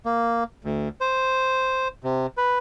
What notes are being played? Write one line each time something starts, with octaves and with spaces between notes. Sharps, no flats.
A#3
D2
C5
C3
B4